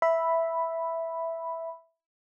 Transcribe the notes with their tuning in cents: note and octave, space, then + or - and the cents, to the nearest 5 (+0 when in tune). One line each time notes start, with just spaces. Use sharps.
E5 +0 B5 +0